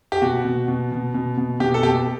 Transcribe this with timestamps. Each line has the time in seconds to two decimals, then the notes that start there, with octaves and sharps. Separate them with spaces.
0.12 G4
0.22 B2 F#4
0.45 B2
0.68 B2
0.92 B2
1.14 B2
1.37 B2
1.60 B2 G4
1.74 A4
1.83 B2 G4